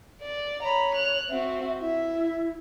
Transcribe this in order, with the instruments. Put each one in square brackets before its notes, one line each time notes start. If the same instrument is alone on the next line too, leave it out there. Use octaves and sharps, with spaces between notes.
[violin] D5
[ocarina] C#5 [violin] A#5 B5
[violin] F#6 F7
[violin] C4 F#4 [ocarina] E5
[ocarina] E4 [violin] E5